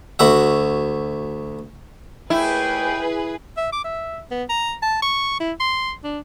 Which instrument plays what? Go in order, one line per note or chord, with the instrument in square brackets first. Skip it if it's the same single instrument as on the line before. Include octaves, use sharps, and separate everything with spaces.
[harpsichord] D2 F#4 E5
[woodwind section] D#2 A3 G5 [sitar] E4 [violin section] G#4 B4
[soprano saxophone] E5
D6
E5
B3
A#5
A5
C#6
E4
C6
D4